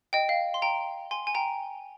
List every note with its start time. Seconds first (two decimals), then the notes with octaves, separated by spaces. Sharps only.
0.13 D#5 G5
0.29 F5
0.54 C6
0.62 G5 A#5
1.11 G#5 C6
1.27 G#5
1.35 G5 A#5